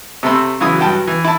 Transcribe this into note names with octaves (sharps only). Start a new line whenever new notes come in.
C3 A3 C4 B5 C6 E6
C#3 E3 F#3 E4 D#6
G2 F#3 G5 A5 B5
E3
E4 A5